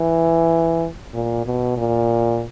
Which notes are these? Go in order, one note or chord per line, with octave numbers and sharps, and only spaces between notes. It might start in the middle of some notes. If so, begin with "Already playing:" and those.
Already playing: E3
A#2
B2
A#2